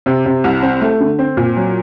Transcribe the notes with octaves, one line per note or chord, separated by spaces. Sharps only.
C3
C3
C2
C4
A3
D3
C4
A#2
F#3